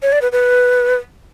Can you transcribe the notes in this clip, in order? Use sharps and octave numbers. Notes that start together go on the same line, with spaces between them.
C#5
D5
B4
B4